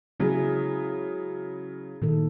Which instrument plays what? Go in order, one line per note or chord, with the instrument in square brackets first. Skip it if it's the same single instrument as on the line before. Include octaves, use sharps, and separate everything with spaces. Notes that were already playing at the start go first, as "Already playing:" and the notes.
[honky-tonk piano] C#3 F#3 [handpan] E4 G#4
[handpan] A#2 D#3 A4